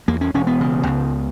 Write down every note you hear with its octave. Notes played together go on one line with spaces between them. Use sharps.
E2 A#3
C#4
E1 C#4
B3
C#3
C#2